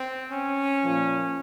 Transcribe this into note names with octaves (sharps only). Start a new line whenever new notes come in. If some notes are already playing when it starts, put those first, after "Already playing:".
Already playing: C4
C#4
A#2 F3 A#3